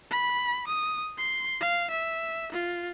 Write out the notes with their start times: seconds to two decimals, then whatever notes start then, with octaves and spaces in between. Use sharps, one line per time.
0.11 B5
0.68 D#6
1.18 C6
1.61 F5
1.91 E5
2.53 F4